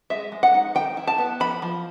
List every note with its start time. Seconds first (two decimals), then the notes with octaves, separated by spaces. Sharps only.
0.10 G#3 E5
0.32 G#3
0.43 F#5
0.54 D#4
0.75 D#3 G5
0.97 E4
1.07 A5
1.18 B3
1.40 F3 B5
1.62 F3